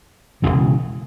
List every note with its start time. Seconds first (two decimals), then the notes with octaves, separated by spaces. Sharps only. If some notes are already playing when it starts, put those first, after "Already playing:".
0.42 E1 D2 C#3 E3